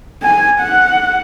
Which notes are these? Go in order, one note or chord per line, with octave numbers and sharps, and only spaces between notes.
G#5
F#5